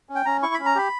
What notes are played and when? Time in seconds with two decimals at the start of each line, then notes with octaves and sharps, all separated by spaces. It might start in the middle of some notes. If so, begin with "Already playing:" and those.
0.09 C#4
0.15 G5
0.26 C#4 A#5
0.42 E4 C#6
0.54 B5
0.59 C#4
0.66 A#5
0.75 G4 B5